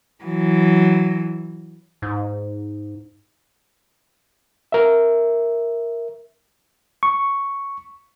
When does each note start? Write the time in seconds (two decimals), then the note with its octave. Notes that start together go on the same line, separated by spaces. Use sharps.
0.24 E3 F#3
2.02 G#2
4.72 A#4 E5
7.03 C#6